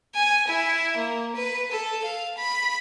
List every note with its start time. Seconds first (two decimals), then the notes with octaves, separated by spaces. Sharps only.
0.15 G#5
0.48 E4
0.97 A#3
1.36 B4
1.71 A4
2.04 F5
2.38 B5